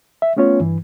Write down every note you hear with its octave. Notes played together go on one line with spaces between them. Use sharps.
E5
A3 B3 C#4 F4 C#5
G2 E3